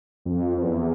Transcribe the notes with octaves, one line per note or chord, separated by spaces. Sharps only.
F2
F2
E2